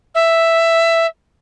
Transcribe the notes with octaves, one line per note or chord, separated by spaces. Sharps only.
E5